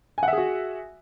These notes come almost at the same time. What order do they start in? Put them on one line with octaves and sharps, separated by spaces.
G#5 F#5 E5 G#4 F#4